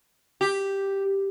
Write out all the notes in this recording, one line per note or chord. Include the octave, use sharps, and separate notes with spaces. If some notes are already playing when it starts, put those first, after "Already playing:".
G4